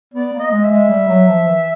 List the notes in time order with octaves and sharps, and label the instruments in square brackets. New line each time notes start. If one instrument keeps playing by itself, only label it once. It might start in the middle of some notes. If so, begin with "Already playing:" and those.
[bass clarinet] B3 [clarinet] D5
[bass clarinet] A#3
[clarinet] D#5
[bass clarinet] G#3
[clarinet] E5
[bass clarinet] G#3
G3
F#3
F3
E3